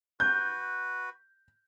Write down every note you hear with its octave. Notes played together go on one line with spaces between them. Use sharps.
F#4 B4 G6